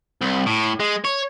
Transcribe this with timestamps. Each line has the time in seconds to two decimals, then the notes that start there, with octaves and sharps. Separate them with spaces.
0.22 C2
0.46 A2
0.80 G#3
1.04 C#5